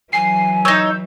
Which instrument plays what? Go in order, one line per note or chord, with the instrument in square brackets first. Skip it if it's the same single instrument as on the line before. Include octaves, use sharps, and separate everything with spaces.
[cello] E3 F#3 [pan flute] G#5 [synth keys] C7
[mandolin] D#4 C#5 [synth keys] E6 G6